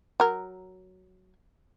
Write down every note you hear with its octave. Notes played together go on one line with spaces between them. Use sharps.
F#3 A#4